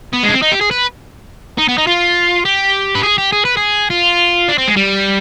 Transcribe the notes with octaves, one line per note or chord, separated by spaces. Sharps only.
B3
G#3
D4
C4
D#4
G4
G#4
B4
D#4
B3
D#4
F4
G4
B4
G#4
G4
G#4
B4
G#4
F4
D4
C4
G#3
G3